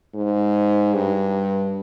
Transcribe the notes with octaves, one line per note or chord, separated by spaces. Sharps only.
G#2
G2